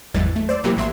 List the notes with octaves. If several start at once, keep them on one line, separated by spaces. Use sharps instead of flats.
G#1 E2 E3 F#3 G#3 A6
A3
C5 D5 E6
C3 E3 F#3 A#3 E4 G4
A1 F#3 E5 C6